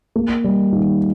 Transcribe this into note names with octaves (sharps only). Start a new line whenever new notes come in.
A#3
G3
D#3